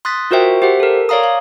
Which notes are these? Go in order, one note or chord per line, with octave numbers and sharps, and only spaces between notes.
C6 D#6 F#6 A6 B6
F4 F#4 A#4 C5 E5 G5
G4 C5 E5 F#5
A4 A#4
C#5 D5 F5 A#5 D#6
F5